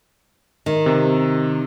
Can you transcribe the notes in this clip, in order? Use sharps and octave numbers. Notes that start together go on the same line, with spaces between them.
D#3
C3